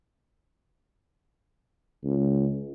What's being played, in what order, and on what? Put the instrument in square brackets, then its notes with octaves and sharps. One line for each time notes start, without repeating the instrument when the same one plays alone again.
[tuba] C#2